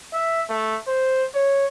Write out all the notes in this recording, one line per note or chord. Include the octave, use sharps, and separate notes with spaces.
E5
A3
C5
C#5